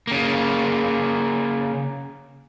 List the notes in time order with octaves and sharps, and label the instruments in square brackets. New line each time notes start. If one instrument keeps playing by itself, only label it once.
[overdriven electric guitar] C#3 A#3